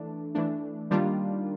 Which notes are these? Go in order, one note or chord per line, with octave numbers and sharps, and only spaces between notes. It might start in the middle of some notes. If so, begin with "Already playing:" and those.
Already playing: E3 A3 D4
E3 A3 D4
D#3 G3 A#3 D4 F4